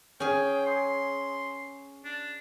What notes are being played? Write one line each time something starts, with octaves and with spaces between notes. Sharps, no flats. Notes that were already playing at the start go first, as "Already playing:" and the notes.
C#4 G#4 G5
C6
D4